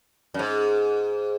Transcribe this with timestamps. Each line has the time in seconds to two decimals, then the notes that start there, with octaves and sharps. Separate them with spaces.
0.34 F#2
0.39 G#2